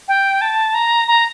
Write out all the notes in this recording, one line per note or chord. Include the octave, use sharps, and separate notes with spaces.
G5
A5
A#5
A#5